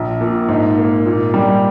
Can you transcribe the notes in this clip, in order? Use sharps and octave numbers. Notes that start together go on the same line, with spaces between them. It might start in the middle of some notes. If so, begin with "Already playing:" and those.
Already playing: A#1
A#2
G#2
A#3
A#2
G3